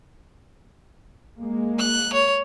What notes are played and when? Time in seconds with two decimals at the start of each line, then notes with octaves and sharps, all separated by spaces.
1.38 G#3 A#3
1.78 F#6
2.13 C#5